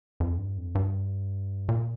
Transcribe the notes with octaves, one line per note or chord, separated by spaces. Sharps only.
F2
G2
F2
G2
A#2